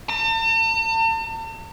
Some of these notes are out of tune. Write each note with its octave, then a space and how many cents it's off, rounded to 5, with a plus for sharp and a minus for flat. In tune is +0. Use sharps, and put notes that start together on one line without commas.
A5 +45